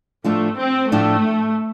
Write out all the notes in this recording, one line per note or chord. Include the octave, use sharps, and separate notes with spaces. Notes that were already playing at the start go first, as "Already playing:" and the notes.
A2 F3 A3 D4 F4
C4
A2 F3 A3 D4 F4